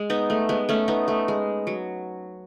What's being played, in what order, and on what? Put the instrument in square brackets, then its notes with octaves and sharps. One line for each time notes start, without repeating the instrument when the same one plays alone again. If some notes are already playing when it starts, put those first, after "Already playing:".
Already playing: [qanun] G#3
B3 D#4
A3
G#3 B3
A3 C#4
B3 D#4
A3
G#3
F#3